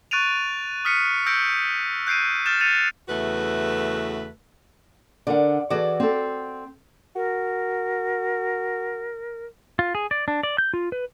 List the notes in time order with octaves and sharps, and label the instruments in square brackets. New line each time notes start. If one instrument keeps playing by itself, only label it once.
[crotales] C#6 F#6 A6 D7 D#7 F7
D#6 F6 B6 C#7 D#7
E6 G6 A#6 C#7 D7
F#6 G6 C7 D7 D#7
F6 G6 A6 E7
A6 C#7 D#7 F7
[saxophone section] E2 C#3 A3 F#4 B4
[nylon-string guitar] D3 A#4 F#5 [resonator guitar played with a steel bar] D5
[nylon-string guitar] E3 G#4 A4 [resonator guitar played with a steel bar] F#4 D5
[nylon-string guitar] C4 A4
[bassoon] F#4 [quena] A#4
[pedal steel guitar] F4
G#4
D5
D4
D5
G6
F4
B4